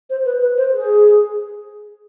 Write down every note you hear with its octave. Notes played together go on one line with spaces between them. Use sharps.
C5
B4
B4
C5
G#4